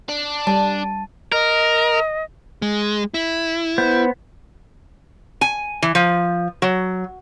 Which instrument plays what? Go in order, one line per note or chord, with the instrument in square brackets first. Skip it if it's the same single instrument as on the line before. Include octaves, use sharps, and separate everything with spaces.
[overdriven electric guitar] D4
[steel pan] G3 [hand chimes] A5
[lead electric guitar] A#4 [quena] D#5
[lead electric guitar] G#3
E4
[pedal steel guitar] B3 C5 G6
[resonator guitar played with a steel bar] G#5
E3
F3
F#3